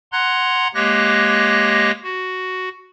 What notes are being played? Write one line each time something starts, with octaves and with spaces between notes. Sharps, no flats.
F#5 A#5 C6 F#6 G#6
G#3 A#3 G4 C#5 F#6 A#6
F#4